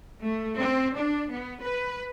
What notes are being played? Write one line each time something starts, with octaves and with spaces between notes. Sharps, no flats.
A3
C4
D4
B3
B4